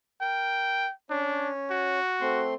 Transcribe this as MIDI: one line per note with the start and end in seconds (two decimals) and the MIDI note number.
0.21 0.86 70
0.21 0.92 79
1.10 1.99 61
1.10 1.50 62
1.10 1.99 73
1.70 2.46 66
2.21 2.54 57
2.21 2.54 60
2.21 2.54 84